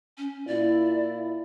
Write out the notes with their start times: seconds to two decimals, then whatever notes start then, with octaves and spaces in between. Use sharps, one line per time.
0.18 C#4
0.47 A#2 E4 D5